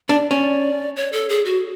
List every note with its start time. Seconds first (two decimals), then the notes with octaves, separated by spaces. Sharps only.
0.09 D4 D5
0.31 C#4 D5
0.96 C#5
1.12 A4
1.29 G#4
1.45 F#4